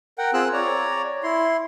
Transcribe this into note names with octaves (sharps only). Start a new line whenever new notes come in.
A#4 F#5 G5
C4 F4 G#4 E6 F#6
C#5 D5 A#5
E4 C6